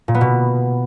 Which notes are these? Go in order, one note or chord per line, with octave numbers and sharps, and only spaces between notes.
A#2
B3
B2